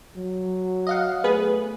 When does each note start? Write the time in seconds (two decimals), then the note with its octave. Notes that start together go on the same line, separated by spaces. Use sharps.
0.17 F#3
0.87 D#5 F5 F#5
1.24 A3 B3 G#4 B4